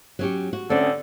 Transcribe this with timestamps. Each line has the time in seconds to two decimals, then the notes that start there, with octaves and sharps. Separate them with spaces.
0.19 F#3 C#4 G4
0.53 F#4
0.70 D3 C4 C#4